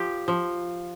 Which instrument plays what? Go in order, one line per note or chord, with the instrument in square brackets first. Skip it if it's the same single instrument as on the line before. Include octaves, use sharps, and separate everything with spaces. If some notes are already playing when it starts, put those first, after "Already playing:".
Already playing: [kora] F3 G4
F3